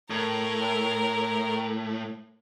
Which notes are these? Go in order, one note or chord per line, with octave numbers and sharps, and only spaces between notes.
A2 A#4